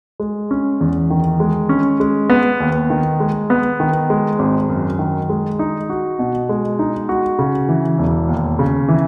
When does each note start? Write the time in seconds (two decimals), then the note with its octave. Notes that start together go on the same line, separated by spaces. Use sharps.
0.20 G#3
0.51 C#4
0.81 E2
1.10 D#3
1.40 G#3
1.69 C#4
2.00 G#3
2.30 B3
2.60 D#2
2.90 D#3
3.20 G#3
3.50 B3
3.80 D#3
4.10 G#3
4.39 G#1
4.69 F#2
4.99 D#3
5.29 G#3
5.59 D#4
5.90 F#4
6.19 B2
6.49 G#3
6.79 D#4
7.09 F#4
7.39 C#3
7.69 E3
7.98 E1
8.29 D#2
8.59 C#3
8.88 E3